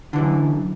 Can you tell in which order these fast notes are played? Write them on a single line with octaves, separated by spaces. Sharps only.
D3 E3 F#2